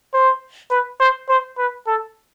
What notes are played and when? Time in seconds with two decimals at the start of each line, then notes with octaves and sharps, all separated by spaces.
0.14 C5
0.71 B4
1.00 C5
1.29 C5
1.58 B4
1.87 A4